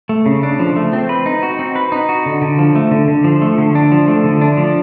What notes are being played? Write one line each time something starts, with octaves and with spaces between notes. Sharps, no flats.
A3
C#3
D4
F3
A3
C4
B4
D#4
F#4
C4
B4
D#4
F#4
D3
D3
F3
A3
D3
D3
F3
A3
D3
D4
F3
A3
D3
D4
F3